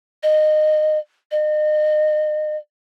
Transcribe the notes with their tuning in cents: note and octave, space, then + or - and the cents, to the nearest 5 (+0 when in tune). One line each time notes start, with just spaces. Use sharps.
D#5 -20
D#5 -35